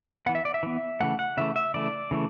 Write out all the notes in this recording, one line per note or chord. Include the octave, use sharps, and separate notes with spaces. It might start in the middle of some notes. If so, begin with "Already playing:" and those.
E3 B3 F#5
E5
D5
E5
E3 B3
C#3 E3 A3 F#5
F#5
C#3 E3 A3 E5
E5
C#3 E3 A3 D5
C#3 E3 A3